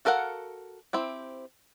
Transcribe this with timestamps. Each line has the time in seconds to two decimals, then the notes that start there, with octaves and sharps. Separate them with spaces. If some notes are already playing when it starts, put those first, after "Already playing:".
0.05 F#4 A4 A#4 F5 F#5
0.93 C4 E4 G4